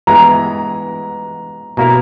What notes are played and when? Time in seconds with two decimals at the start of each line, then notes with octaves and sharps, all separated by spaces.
0.07 E3 G#3 B3 E4 G#4 A#5
1.77 B2 A#3 E4 A#4 A#5